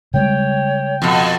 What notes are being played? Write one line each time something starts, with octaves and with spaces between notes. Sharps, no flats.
C#3 G3 G#3 C#5 G5
F2 B2